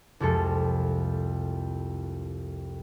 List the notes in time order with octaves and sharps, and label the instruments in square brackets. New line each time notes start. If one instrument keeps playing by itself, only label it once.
[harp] C2 F2 G#3 A4